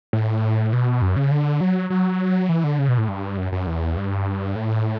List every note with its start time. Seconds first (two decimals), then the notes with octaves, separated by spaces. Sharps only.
0.13 A2
0.73 B2
1.02 F#2
1.16 C#3
1.31 D3
1.61 F#3
1.90 F#3
2.49 E3
2.64 D3
2.79 C#3
2.88 B2
2.98 A2
3.08 G2
3.38 F#2
3.52 F#2
3.67 E2
3.97 G2
4.56 A2